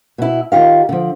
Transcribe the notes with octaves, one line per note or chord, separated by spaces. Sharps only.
B2 E4
D#3 F4 G4 F5
D3 F3